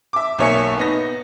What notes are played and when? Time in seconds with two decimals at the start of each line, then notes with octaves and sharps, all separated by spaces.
0.13 E5 D6
0.39 B1 A#3 C#5 E5 G#5 C#7
0.78 B3 D#4 A#6